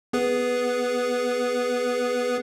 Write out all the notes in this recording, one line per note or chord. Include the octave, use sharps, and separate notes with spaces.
B3 G#4 B4